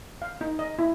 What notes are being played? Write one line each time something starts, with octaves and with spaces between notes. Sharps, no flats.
F5
D#4
D#5
E4